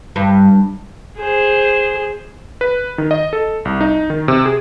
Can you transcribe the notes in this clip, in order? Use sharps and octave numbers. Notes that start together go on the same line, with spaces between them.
G2
G#4 C5
B4
D#3
D#5
A4
C2
D#4
D#3
C3
G#4